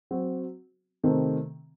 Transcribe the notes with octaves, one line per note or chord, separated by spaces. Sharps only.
F#3 C4 F#4
C3 D#3 A3 C4